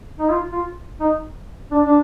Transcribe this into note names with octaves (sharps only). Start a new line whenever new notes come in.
D#4
F4
F4
D#4
D4
D4